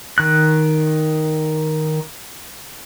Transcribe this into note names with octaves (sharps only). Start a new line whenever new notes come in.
D#3 F#6